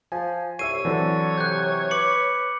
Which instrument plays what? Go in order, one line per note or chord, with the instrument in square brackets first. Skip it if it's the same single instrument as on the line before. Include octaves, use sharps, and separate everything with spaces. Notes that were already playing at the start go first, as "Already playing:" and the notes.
[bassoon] F3 [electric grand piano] G#5
[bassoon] C2 [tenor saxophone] C#5 [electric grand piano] E5 E6 C7 [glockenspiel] D#7
[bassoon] D3 [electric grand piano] E3 F#3 C4
[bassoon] C3 [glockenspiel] F#6 G6
[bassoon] B4 [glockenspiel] D6 C#7 F#7